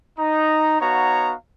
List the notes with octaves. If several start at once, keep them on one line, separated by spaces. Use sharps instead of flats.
D#4 A#5
B3 D#4 F#4 C#5 F5 A#5